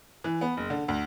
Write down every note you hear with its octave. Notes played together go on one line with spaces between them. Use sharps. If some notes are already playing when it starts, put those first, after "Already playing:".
E3
B3
F#1
D3
D2